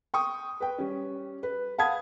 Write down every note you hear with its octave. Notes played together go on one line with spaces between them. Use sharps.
G5 C#6 D#6
B4 G5
G3 C#4
B4
F5 F#5 A5 B5 D#6 G#6